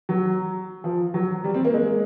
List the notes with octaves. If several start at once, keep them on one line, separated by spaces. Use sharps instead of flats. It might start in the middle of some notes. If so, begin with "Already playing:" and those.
F#3
F3
F#3
G3
C4
A#3
G#3